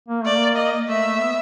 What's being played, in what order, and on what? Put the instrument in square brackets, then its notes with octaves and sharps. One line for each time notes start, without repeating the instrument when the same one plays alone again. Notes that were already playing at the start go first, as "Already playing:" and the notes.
[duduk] A#3
[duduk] A3 [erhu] D5
[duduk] A#3
[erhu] D#5
[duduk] A3 [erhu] E5
[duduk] A3
B3